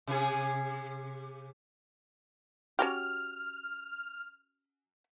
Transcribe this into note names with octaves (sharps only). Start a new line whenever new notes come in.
C3 G#4
C#4 F#4 G4 F6